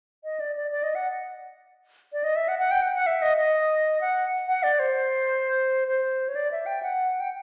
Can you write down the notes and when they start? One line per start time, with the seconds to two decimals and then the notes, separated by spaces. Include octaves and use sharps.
0.24 D#5
0.40 D5
0.56 D5
0.71 D5
0.83 D#5
0.95 F#5
2.13 D5
2.24 D#5
2.36 E5
2.48 F#5
2.59 F#5
2.71 G5
2.82 F#5
2.95 F#5
3.07 E5
3.22 D#5
3.37 D#5
4.01 F#5
4.47 F#5
4.63 D5
4.79 C5
5.88 C5
6.28 C#5
6.35 D5
6.52 E5
6.66 G5
6.83 F#5
7.20 G5